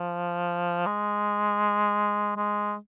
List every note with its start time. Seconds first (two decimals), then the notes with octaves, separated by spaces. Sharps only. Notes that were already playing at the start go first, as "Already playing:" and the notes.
Already playing: F3
0.86 G#3
2.36 G#3